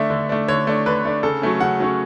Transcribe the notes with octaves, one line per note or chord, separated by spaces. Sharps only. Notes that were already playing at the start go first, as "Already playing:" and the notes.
Already playing: D3 A3 D4 E5
D3
A3 D4
D3 C#5
A3 D4
D3 B4
A3 D4
C#3 A4
F#3 A3 C#4
C#3 F#5
F#3 A3 C#4